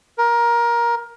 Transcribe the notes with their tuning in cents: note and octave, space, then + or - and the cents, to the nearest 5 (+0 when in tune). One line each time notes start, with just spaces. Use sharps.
A#4 +20